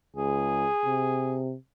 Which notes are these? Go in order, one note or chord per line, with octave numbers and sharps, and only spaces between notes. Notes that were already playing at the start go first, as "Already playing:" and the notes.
C#2 G#4
C3